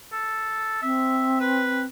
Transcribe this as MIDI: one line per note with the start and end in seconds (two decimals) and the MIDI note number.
0.13 0.77 69
0.82 1.86 60
0.82 1.36 76
1.40 1.82 71